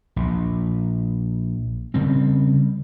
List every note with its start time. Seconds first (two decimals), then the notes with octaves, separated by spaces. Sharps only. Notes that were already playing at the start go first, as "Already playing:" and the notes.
0.16 A#1
1.94 C#3 G3 C4